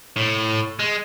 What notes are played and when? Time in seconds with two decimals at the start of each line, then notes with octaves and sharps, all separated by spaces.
0.16 A2
0.79 G#3